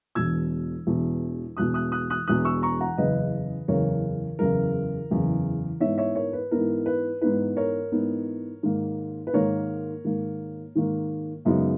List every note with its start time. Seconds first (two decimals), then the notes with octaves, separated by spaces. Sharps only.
0.15 E1 E2 B2 E6 G#6
0.87 E1 E2 B2
1.57 E1 E2 B2 D#6 F#6
1.74 D#6 F#6
1.92 D#6 F#6
2.10 D#6 F#6
2.27 E1 E2 B2 D#6 F#6
2.45 C#6 E6
2.62 A#5 C#6
2.80 F#5 A#5
2.98 F#1 E2 C#3 B4 D#5
3.68 F#1 E2 C#3 A#4 C#5
4.39 F#1 E2 C#3 A#4
5.11 F#1 E2 C#3
5.80 G#2 E3 B3 D#4 C#5 E5
5.98 C#5 E5
6.15 A#4 C#5
6.33 B4
6.51 G#2 E3 B3 D#4 A#4
6.86 B4
7.21 G#2 E3 B3 D#4 B4
7.57 A#4 C#5
7.92 G#2 E3 B3 D#4
8.63 G#2 D#3 A#3
9.27 B4
9.33 G#2 D#3 A#3 A#4 C#5
10.04 G#2 D#3 A#3
10.75 G#2 D#3 A#3
11.45 F#2 C#3 G#3 B3 D#4